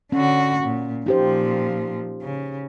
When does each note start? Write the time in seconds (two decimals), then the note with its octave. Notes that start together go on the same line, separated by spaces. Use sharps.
0.12 D3 C#4 F#4
0.64 A#2
1.06 A#2 F3 D#4 G4 C5
2.22 C#3